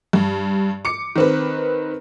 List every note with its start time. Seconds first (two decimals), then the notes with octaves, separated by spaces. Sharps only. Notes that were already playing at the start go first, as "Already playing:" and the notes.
0.13 G2
0.85 D6 C#7
1.16 D#3 C4 B4